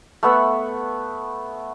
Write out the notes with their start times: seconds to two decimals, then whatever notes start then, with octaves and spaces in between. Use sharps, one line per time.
0.23 A3 B3 E5 F#5